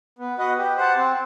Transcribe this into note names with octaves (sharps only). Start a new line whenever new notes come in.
B3
F#4 B4 D#5 F#5
G4
C5 F#5 A5
C4